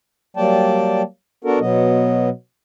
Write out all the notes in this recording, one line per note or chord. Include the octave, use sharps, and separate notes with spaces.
F#3 G3 A#3 D5 G5 A5
B3 D4 F#4 A4 A#4
B2 F#3 B3 D#5